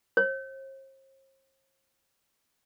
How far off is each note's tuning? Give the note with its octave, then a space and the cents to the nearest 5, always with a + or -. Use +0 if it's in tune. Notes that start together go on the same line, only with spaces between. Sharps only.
C5 +45